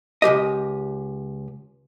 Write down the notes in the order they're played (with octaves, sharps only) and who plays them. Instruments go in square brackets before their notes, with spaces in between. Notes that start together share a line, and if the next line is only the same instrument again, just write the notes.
[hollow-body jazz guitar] C#2 D#3 G4 D#5